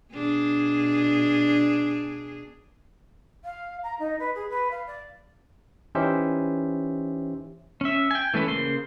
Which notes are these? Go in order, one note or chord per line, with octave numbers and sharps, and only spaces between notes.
B2 D4 G#4
F5
A#5
D#4
B4
G#4
B4
F5
D5
E3 C#4 D#4 G4 C5 E5
C#4 E5
G5 G#5
E3 A3 C#4 B4
C#3 A#3 C5 C6